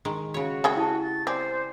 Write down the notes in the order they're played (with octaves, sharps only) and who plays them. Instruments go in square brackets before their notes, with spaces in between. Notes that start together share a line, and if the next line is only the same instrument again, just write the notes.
[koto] D#3 G#3
[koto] C#3 C#5 [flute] F#4
[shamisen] G#3 G#4 G5
[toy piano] E4 G4 A5
[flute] A6
[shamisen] C4 [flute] C5 [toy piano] D5 G#5 D6